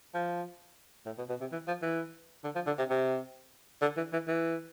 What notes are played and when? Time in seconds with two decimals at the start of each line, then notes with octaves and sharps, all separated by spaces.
0.15 F3
1.06 A2
1.18 B2
1.30 B2
1.41 C3
1.52 E3
1.68 F3
1.82 E3
2.45 D3
2.55 F3
2.67 D3
2.79 C3
2.90 C3
3.82 D3
3.97 E3
4.13 E3
4.28 E3